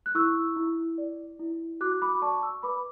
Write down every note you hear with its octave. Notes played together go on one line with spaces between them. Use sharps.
F#6
E4 C#6 E6
E4
D5
E4
F#4 D6 F#6
B5 D6
D6
D5 A5 C#6
C#6 E6
B4 B5 D6